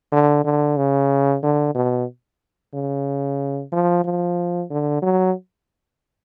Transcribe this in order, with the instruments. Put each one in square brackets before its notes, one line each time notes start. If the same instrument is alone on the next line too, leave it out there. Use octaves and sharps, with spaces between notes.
[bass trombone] D3
D3
C#3
D3
B2
C#3
F3
F3
D3
F#3